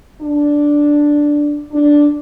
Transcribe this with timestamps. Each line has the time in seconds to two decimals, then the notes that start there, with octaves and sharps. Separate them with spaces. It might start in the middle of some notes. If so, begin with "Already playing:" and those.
0.22 D4
1.72 D4